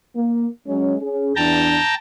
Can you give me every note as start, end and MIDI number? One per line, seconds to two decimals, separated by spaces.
0.15 0.47 58
0.67 0.95 54
0.67 0.95 56
0.67 0.95 61
1.02 1.33 61
1.02 1.33 68
1.36 1.78 40
1.36 1.78 62
1.36 1.95 79
1.36 1.95 81
1.36 1.95 82